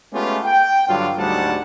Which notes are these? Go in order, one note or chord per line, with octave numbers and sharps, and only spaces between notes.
G#3 A3 B3 C#4 F4 G4
G5
G2 D3 F#3 G3 F4
D2 G#2 F#3 G3 F#5 A5